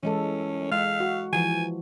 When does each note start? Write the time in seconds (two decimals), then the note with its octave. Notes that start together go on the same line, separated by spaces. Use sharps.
0.03 E3 G#3 C#4 A4
0.72 G#3 F5
1.00 F#4
1.33 E3 F3 G#5